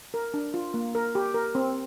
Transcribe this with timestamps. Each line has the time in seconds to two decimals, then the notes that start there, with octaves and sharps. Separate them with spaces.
0.14 A#4
0.34 D4
0.54 F4
0.74 A#3
0.95 A#4
1.15 G4
1.34 A#4
1.55 C4